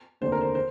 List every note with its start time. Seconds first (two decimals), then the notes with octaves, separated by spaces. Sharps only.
0.21 F1 D#2 D3 C5
0.32 A#4
0.41 C5
0.55 C5